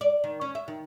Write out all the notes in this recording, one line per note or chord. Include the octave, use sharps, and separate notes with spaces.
D5
D#3
C#4
E5
D#3